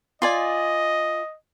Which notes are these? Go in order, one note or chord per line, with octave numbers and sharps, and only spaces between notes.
F4 D5 D#5 G#5